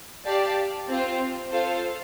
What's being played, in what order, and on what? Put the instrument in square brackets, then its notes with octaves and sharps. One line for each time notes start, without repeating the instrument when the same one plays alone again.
[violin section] G4 D5 F5 A5
C4 F4 C5
F4 A4 C5 F5